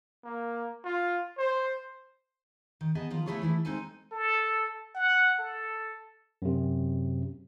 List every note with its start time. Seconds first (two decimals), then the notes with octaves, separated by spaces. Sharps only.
0.24 A#3
0.84 F4
1.38 C5
2.81 D#3
2.95 B3 G#4 D#5 A5
3.10 D#3 F3 F4
3.26 A3 B3 E4 G#4 A4 C#5
3.42 E3 A3 E4
3.65 G#3 C4 D#4 A4 G#5
4.12 A4
4.95 F#5
5.39 A4
6.42 F#2 C3